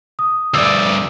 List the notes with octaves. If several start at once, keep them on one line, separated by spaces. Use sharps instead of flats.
D#6
D2 G2 D5 E6